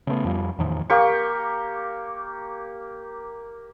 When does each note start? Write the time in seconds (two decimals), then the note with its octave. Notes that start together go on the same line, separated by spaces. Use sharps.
0.07 C#3 A3 B3
0.25 F2 F3 G3
0.58 E2 A2 D#3 F3
0.90 A#3 G4 C#6